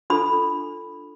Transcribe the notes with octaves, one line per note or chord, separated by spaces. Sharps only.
D4 F4 A4 B5